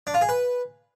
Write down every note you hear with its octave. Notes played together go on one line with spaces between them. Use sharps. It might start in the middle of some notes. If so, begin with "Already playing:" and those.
D4
F4
G#4
B4